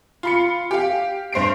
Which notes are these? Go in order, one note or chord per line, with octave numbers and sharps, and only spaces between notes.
F4 B5 C#7
G4 F5
G2 C5 C7 D7